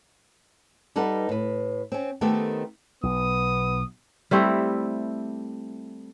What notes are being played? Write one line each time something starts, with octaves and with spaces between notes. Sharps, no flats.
G3 D#4 A4 B4 F#5
A2 B4
C4 C#4
D#3 A3 B3 C4 G4 A4
B1 B3 D#6
G3 A3 C4 E4